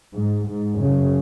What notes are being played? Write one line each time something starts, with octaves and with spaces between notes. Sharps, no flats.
G#2
G#2
F#2 C#3